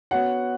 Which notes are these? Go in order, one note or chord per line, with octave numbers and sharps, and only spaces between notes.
B3 F#4 C#5 F#5